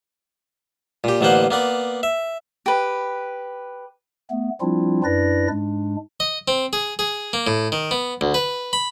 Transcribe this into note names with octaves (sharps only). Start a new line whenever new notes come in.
A#2 G4
A1 D3 A#3 B3 C5 F#5
A#3 B3 D5
E5
G4 B4
A3 B3
F3 G3 C4 D4 E4 F4
F#2 D4 E4 B4 D5 A#6
G#2 G#3 D4
D#5
C4
G#4
G#4
A#3
A2
D#3
B3
D2
B4
B5